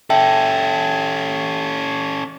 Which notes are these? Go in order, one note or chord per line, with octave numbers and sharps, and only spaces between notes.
C#4 A4 E5 G5 A5